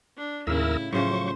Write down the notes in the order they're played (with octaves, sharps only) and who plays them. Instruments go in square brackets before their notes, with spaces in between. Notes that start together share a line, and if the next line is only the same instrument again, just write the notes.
[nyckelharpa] D4
[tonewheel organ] D#2 A#4 E6 [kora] A2 C#3 [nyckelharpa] E4
[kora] A2 C#3 F3 [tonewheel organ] F#3 C#6 [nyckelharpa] C5